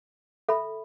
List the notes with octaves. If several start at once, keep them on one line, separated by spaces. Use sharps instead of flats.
A4 E5 B5